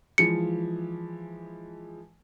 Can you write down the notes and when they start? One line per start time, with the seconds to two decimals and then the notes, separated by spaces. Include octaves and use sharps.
0.18 E3 F3 G#3 C#7